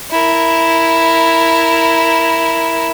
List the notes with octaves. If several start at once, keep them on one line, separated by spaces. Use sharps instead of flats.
E4 A#4